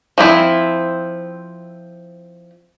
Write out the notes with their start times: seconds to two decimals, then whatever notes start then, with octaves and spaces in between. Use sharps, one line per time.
0.18 F3 C4 E4